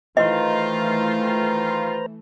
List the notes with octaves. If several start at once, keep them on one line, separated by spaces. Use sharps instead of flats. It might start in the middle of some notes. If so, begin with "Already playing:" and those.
D#3 E3 A3 F4 B4 C5 D#5 A#5